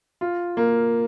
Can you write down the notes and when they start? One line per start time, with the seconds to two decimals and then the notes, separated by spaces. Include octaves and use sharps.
0.21 F4
0.57 A#3